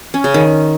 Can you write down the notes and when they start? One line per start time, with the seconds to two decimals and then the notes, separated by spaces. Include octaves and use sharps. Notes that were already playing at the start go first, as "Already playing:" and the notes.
0.14 C#4
0.24 C#3
0.34 D#3